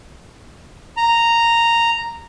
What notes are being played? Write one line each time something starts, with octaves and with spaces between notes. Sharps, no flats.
A#5